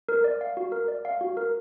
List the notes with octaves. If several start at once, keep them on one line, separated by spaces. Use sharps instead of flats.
A#4
D5
F5
F#4
A#4
D5
F5
F#4
A#4